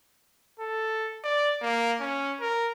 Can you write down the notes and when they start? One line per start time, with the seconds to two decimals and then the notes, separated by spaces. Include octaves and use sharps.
0.60 A4
1.24 D5
1.62 A#3
2.00 C#4
2.41 A#4